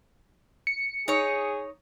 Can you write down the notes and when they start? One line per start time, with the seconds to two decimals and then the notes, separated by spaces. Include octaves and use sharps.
0.67 C#7
1.08 D#4 G#4 C#5